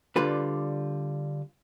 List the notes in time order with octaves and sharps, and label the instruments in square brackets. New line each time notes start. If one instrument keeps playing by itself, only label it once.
[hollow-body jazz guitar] D3 G3 F4 B4